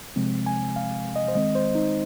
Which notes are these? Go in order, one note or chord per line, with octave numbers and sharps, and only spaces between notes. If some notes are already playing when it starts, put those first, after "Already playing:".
C3 F3 G#3 C4
G#5
F5
D#5
C5
D#3 G#3 C4 D#5
C5
D#4